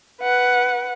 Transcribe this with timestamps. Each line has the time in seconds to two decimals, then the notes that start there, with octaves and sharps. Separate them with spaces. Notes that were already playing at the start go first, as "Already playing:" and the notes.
0.22 B4 F#5